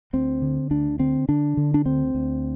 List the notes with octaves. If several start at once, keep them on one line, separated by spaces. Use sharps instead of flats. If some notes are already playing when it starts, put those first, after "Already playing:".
D2 C4
D3
D2 D4
D3 C4
D3 D4
D3
D4
D2 C4
D2